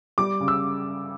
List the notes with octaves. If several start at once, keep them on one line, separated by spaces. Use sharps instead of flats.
G3 D6
C#3
E6